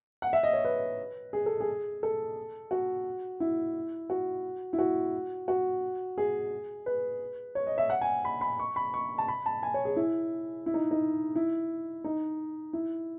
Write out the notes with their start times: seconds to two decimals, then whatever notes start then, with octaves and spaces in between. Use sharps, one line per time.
0.22 F#5
0.33 E5
0.43 D#5
0.53 C#5
0.65 B4
1.33 G#4
1.46 A4
1.60 G#4
2.03 A4
2.71 F#4
3.40 E4
4.10 F#4
4.73 E4
4.79 F#4
5.48 F#4
6.18 G#4
6.86 B4
7.55 C#5
7.67 D#5
7.78 E5
7.90 F#5
8.01 G#5
8.25 B5
8.41 B5
8.59 C#6
8.76 B5
8.94 C#6
9.18 A5
9.28 B5
9.46 A5
9.63 G#5
9.74 C#5
9.85 G#4
9.96 E4
10.66 E4
10.74 D#4
10.91 D#4
11.36 E4
12.04 D#4
12.73 E4